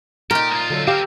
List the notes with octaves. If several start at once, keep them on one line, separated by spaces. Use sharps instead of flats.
A#2 D#4 G4 A#4
C2 F4
D3 F#3 A4
C4 G4 A#4 F5 E6